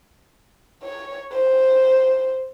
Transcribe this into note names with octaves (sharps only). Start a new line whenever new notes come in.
C#5
C5